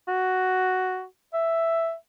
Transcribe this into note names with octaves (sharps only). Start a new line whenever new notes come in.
F#4
E5